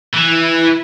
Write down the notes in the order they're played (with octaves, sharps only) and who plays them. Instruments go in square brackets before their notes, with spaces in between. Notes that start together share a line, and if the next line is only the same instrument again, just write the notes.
[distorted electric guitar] E3 [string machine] E4